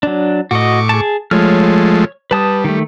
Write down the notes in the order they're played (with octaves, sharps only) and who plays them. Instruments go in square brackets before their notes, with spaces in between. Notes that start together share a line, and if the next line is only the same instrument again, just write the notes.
[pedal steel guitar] F#3 D4
[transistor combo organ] A2 C#6 D6 [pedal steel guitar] F#4 D#5
[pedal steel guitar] G#4 A5
[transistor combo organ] F3 G#3 A3 [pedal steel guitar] C#5 F6
[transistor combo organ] G3 [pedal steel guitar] B4 A5 D#6
[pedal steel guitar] D#3 A3